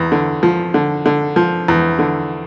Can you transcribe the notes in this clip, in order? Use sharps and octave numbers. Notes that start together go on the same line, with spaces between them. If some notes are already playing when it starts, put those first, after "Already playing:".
Already playing: E2
D3
F3
D3
D3
F3
E2
D3